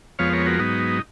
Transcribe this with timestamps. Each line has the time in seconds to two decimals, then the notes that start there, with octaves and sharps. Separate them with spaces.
0.19 F2 F3 G#3 B3 C#5 F5
0.33 A#4 C#5
0.46 F#4 A#4
0.59 G#2 F#3 B3 D#4